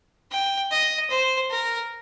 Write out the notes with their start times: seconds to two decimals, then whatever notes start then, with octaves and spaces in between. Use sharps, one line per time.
0.31 G5
0.71 D#5
1.10 C5
1.50 A#4